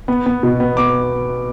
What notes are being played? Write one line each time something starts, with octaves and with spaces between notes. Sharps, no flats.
B3
B3
B2
B3
B3 D6